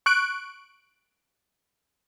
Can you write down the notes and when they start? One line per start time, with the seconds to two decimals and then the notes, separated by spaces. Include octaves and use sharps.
0.06 C#6 F#6 D7